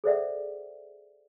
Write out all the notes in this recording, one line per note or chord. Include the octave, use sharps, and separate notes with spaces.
G#4 A4 C5 D5 E5 F#5